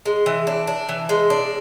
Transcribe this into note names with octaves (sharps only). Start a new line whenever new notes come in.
G#3
E3
D4
D4
E3
G#3
D4